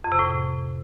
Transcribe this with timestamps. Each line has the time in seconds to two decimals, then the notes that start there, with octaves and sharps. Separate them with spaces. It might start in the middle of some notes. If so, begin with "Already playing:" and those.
0.04 F2
0.12 C3
0.19 A2